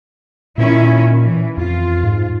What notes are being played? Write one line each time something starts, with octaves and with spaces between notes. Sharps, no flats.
A#2 D#3 C#4 E4
E3
F2 F4
G#2